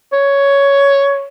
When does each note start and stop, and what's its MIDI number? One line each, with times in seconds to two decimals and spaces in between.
0.12 1.27 73